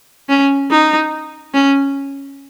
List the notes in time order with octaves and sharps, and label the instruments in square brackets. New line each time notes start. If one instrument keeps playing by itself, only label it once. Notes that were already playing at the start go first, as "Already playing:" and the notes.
[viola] C#4
D#4
C#4